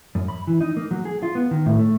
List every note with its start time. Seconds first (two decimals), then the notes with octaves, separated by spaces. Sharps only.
0.15 F#2
0.28 B5
0.47 E3
0.61 D#4
0.77 A#3
0.91 F#3
1.05 G#4
1.23 F4
1.35 B3
1.51 D#3
1.66 A2
1.79 A3